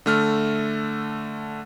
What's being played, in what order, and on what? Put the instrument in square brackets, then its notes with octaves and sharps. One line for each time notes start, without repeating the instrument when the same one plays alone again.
[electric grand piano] D3 A3 F6